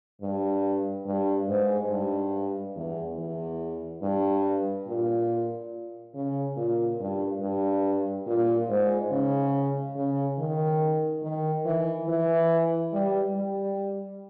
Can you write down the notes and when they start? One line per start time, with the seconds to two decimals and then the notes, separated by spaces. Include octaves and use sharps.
0.22 G2
1.06 G2
1.48 G#2
1.90 G2
2.76 E2
3.18 E2
4.02 G2
4.87 A#2
6.14 C#3
6.56 A#2
6.99 G2
7.41 G2
8.26 A#2
8.69 G#2
9.11 C#3
9.95 C#3
10.38 D#3
11.22 D#3
11.65 E3
12.08 E3
12.93 G3
13.35 G3